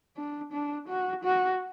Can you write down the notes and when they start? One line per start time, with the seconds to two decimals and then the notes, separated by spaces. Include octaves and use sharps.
0.16 D4
0.52 D4
0.88 F#4
1.24 F#4